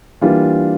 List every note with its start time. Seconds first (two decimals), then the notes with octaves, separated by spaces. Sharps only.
0.21 E3 G3 A#3 D4 F4